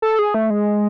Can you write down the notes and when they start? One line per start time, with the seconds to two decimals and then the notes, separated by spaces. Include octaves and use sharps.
0.02 A4
0.19 G#4
0.34 A3
0.50 G#3